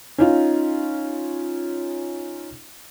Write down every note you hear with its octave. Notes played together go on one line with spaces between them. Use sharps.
C#4 D#4 F4